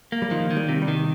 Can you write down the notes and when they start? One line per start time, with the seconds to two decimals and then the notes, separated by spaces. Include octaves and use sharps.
0.12 A#3
0.22 G3
0.31 D#3 F3
0.51 D#3
0.57 G3
0.69 C3
0.82 G3
0.88 D#3